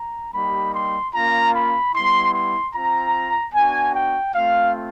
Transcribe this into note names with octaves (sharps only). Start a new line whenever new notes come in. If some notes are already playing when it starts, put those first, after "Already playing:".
Already playing: A#5
G3 A#3 D#4 G4 B5
C6
A#3 C#4 F4 A#5
B5
G3 B3 E4 C6
C6
C4 F4 A#5
B3 D4 F#4 G#5
G5
A3 C4 F4 F5